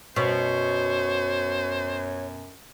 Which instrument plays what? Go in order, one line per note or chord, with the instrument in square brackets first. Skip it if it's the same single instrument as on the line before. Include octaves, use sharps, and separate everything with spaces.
[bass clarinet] F#2 [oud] B2 [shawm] C5 [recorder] C#5